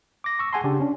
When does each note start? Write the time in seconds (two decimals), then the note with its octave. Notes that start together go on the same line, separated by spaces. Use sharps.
0.24 D6 A#6
0.39 C#6 E6
0.53 G#4 F#5 G#5 A5 C6
0.64 C#3 D4 G4 A5
0.80 C#4 D4